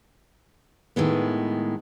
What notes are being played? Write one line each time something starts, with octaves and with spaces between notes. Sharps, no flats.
A2 D#3 G#3 B3